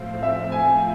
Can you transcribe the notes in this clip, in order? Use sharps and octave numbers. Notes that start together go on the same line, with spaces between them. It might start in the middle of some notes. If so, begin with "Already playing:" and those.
Already playing: A2 F3 A3 C4 F5
E5
G#5